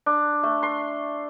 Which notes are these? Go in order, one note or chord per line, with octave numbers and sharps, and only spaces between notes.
D4
A3
C6